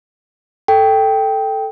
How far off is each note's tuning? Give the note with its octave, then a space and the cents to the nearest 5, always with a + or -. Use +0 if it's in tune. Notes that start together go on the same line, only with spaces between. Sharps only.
A4 +0 G5 +0